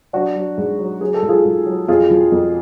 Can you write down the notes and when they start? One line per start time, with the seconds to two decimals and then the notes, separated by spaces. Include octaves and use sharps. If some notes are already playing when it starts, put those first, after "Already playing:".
0.13 F#3 D4 F#4
0.36 F#3
0.58 G#2
0.79 F#3
1.01 F#3 G#4
1.14 A4
1.22 G#2
1.29 F4 G#4
1.45 G#2
1.66 F#3
1.88 F2 F4 G#4
2.10 F3
2.32 F2